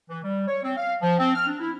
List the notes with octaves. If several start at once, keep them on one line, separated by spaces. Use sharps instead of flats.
E3
G3
C#5
C4
F5
F3
C4
F6
D4
E4